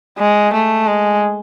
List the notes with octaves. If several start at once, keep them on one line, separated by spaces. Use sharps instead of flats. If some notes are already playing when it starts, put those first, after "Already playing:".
G#3
A3
G#3